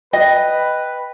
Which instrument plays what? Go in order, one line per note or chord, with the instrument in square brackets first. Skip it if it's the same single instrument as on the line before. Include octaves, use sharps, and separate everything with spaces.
[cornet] B4 [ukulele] D#5 [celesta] G5